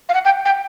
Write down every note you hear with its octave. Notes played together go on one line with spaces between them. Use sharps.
F5
F#5
G5
G5